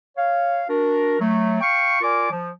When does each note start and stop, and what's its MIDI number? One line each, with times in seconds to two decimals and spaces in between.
0.17 0.63 73
0.17 0.63 77
0.69 1.19 62
0.69 1.19 66
0.69 1.19 70
1.20 1.61 54
1.20 1.61 57
1.61 1.97 77
1.61 1.97 79
1.61 1.97 85
2.02 2.29 65
2.02 2.29 70
2.02 2.29 74
2.02 2.29 80
2.02 2.29 86
2.30 2.50 53